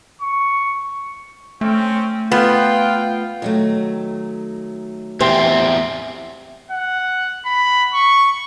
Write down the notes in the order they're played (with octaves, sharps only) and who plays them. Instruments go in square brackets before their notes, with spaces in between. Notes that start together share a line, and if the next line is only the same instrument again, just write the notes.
[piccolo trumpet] C#6
[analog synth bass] A3 [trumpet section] C4 C#4
[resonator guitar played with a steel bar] B3 [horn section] F4 [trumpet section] G5
[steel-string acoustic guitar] D#3 F#3 A3
[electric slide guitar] E2 C4 [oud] G4 C5 [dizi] E5
[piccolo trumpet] F#5
B5
C#6